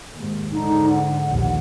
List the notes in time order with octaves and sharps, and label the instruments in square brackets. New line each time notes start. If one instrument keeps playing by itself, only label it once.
[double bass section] D#2 G#2
[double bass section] G#2 D3 [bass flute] D#4
[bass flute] F#5
[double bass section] A#1 D#2 A#2